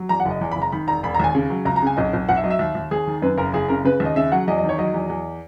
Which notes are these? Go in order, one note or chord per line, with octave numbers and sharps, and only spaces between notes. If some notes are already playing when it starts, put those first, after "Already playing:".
Already playing: F#3
E2 A#5
F#5
F#1
D#5
E2
B5
F#1
A#5
D#3 B5
E1 A#5
E1 B5
A#5
D#2 G#5
C#3
F#3
C#2 A#5
A#5
C#3 G#5
B1 D#5
B1
B1 F#5
E5
F#3 D#5
E5
D#2
D#2
D#2 G#4
D#3
F#2 B4
F#1 A#4
F#1 G#4
C#3 A#4
C#3 B4
D#2
D#5
C#3 E5
F#3 F#5
E2 D#5
D#5
D#3
C#5
F#3 D#5
E2
E2